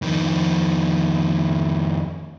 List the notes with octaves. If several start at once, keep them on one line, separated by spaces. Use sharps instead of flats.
F2 D#3